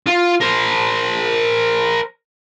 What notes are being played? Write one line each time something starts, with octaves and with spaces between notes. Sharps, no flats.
F4
A#4 C5